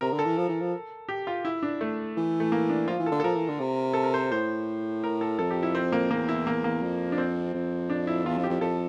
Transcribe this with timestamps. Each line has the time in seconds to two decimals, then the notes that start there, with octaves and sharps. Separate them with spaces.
0.01 C3 A#4
0.13 D3
0.19 A4
0.25 E3
0.37 F3
0.49 E3
0.61 F3
1.08 G4
1.27 F4
1.45 E4
1.63 D4
1.81 A3
2.17 E3
2.40 A3
2.52 A#3
2.69 D4
2.88 F3 F4
3.00 E3
3.06 A4
3.11 D3
3.20 A4
3.24 F3 A#4
3.35 E3
3.48 D3
3.60 C3
3.94 A4
4.04 A#4
4.14 C5
4.32 A2 C5
5.04 A#4
5.21 A4
5.39 F2 A4
5.50 G4
5.63 E4
5.75 C4
5.92 A#3
6.11 E2 A#3
6.28 E4
6.47 A#3
6.64 A#3
6.83 F2
7.12 D4
7.18 C4
7.54 F2
7.90 D4
8.07 E4
8.25 E2 F4
8.38 F2
8.44 G4
8.50 F2
8.61 F2 A4